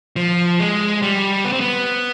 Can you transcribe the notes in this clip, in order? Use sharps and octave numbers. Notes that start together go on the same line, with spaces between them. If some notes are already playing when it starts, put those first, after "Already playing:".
F3
G#3
G3
B3
C4
B3